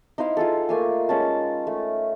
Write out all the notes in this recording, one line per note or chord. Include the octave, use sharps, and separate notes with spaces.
D#4 E4 C5 F5
F4 G#4 A4
A3 A#3 G#5
G#3 C#4 A5
A3